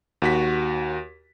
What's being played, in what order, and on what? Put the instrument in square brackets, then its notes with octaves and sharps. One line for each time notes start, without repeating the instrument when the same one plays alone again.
[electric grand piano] D#2 F#4 B6